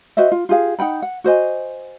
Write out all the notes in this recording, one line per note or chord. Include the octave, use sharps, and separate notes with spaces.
F#4 C5 D#5 E5
F4
F4 G4 G#4 F5
D#4 F#5 G5 B5
F#5
F#4 C5 D#5 G#5